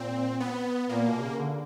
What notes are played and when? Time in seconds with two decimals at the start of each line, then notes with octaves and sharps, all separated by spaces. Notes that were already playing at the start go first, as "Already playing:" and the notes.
Already playing: A#2 C4
0.40 B3
0.89 A#2 A#3
1.06 B2
1.21 C#3
1.39 D3